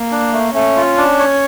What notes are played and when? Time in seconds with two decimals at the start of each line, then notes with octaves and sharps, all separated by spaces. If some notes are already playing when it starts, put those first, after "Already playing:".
Already playing: A#3
0.11 D4
0.33 A3
0.54 A3 C#4
0.76 F4
0.97 D4
1.19 C#5